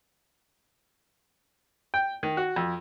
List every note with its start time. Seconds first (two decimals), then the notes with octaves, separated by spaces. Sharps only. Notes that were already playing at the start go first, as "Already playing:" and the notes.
1.94 G5
2.23 D#3
2.37 F#4
2.56 F2